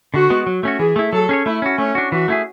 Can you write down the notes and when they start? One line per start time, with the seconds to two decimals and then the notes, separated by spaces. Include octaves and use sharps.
0.14 D3 F#4
0.30 G#3 B3
0.47 F#3
0.63 A3 C#4 F#4
0.79 E3 G#4
0.96 A3 E4
1.13 F#3 A4
1.29 C#4 G#4 C#5
1.45 A3 E4
1.62 C#4 F#4
1.78 A3 C#4
1.95 D4 F#4
2.12 E3 F#4
2.28 A3 E4 G#4